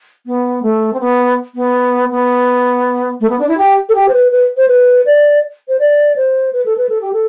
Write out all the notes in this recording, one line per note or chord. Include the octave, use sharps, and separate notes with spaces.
B3
A3
C4
B3
B3
B3
A3
B3
D4
E4
G4
A4
G4
C5
B4
B4
C5
B4
D5
C5
D5
C5
B4
A4
B4
A4
G4
A4